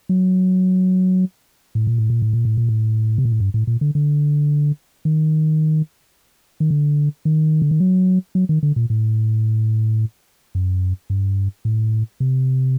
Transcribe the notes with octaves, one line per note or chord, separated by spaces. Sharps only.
F#3
A2
A#2
A2
A#2
A2
A#2
A2
A#2
A2
C3
A#2
A2
G2
A2
A#2
D3
D3
D#3
D#3
D3
D#3
D3
D#3
F#3
F#3
D#3
D3
A#2
A2
F#2
G2
A2
C3